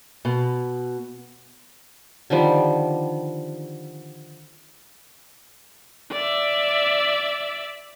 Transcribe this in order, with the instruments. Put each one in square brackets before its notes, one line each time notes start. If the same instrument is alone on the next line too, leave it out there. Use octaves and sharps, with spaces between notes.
[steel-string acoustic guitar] B2
[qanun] D3 D#3 F3 G3
[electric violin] D5 E5